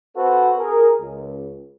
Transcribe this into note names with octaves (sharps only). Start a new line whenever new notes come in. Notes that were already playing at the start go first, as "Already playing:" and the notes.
C4 F#4 A4 B4 C5
G#4 A#4
C#2